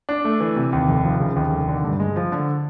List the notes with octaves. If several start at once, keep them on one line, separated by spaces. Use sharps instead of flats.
D4
A3
E3
C3
D#2
F1
F3
C#3
D#2
F1
D3
G2
G#3
F3
D3